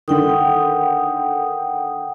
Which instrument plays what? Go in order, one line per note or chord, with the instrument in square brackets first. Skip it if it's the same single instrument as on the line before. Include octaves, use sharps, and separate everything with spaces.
[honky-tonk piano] D3 D#3 [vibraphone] F#5 G5 D#6